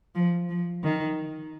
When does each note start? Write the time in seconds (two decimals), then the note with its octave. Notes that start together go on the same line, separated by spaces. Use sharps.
0.15 F3
0.49 F3
0.83 D#3